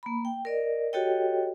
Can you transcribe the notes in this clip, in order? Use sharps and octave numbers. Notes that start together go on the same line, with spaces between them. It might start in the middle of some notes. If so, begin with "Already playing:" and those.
A#3 B5
G5
A#4 D5 D#5
F#4 G4 A4 C#5 D#5 G5